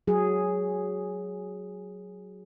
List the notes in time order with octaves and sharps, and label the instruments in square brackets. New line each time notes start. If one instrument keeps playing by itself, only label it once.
[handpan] F#3 G#4